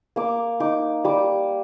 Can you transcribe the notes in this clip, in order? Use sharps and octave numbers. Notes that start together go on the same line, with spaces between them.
A#3 D6
D#4 D6
G3 D6